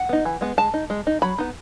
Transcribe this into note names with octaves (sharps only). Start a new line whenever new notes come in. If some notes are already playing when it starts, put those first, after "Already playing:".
Already playing: F#5
B3 D#4
E3
G#3 B3
G#3 A5
D#4
G#3
D#4
F#3 B5
B3 D#4